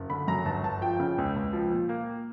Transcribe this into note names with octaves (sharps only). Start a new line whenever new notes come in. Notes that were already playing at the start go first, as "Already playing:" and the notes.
Already playing: F#1
D3 B5
F#2 A#5
G1 A5
G1 A5
F3 G5
C#3
C#2
C#2
F3
A#2
A#3